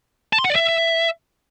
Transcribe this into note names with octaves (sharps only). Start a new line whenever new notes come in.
A5
C6
F#5
D5
E5